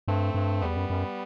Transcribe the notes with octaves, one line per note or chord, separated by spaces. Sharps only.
G2 A3 C4
G2
E2 G3 B3
F#2
F#2